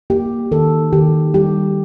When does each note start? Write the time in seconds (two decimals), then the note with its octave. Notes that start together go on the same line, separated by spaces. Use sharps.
0.10 A#3 G4
0.51 D#3 A4
0.93 D#3 G4
1.34 G3 G4